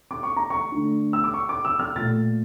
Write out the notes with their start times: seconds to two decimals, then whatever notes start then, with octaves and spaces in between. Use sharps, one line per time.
0.11 D6
0.23 C#6
0.37 A#5
0.50 C#6
0.72 D3 A3
1.13 E6
1.24 D6
1.34 C#6
1.49 D6
1.65 E6
1.79 F6
1.95 A#2 A3 A6